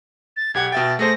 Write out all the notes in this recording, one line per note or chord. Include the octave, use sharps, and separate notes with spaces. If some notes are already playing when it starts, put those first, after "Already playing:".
A6
B1 G4 F#5 G#6
B2 E5 G5 A6
A3 G#4 C5 A#6